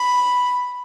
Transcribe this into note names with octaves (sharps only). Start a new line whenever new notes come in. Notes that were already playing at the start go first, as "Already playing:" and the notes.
Already playing: B5